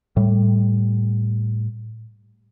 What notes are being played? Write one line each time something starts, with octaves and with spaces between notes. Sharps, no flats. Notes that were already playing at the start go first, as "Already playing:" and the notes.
A2 G3